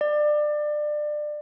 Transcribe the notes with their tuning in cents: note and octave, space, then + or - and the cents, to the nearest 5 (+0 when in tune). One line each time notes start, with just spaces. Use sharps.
D5 +25